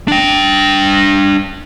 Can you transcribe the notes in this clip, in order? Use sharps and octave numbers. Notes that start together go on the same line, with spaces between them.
D4 G5